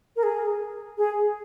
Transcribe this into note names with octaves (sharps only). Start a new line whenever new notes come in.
A#4
G#4
G#4